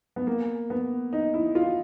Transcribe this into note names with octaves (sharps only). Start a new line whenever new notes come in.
B3
A#3
B3
D#4
E4
F4